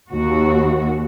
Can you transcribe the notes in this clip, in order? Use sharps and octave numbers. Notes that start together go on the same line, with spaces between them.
D#2 F#4